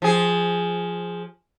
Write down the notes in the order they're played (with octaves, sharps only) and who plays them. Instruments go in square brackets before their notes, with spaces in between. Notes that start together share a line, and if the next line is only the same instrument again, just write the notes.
[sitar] F3 G#4